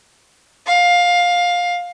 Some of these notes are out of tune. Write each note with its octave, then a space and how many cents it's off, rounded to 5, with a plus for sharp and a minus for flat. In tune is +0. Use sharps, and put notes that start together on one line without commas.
F5 +15